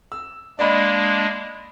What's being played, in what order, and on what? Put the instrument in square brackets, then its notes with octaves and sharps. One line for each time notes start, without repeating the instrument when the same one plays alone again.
[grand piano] E6
[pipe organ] G#3 A#3 D4 [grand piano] D5 D#5 B5